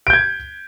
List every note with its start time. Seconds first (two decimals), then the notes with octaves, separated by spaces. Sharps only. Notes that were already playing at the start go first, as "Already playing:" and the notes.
0.07 D7
0.10 G6
0.13 G#6